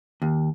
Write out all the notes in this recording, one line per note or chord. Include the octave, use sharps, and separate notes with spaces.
D#2